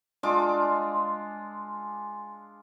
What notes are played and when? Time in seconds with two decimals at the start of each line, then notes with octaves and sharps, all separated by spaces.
0.23 G#3 D4 F4 D6